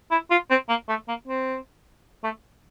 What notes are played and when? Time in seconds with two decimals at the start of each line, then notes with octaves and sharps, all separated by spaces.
0.11 E4
0.30 F4
0.50 C4
0.69 A#3
0.89 A3
1.08 A#3
1.27 C4
2.23 A3